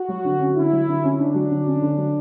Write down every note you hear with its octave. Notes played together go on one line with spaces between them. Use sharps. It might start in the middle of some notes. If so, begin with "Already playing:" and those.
Already playing: F#4
F#3
D3
C#4
D3 E4
F#3
D3
C#4
D3 D4
F#3
D3
C#4
D3
F#3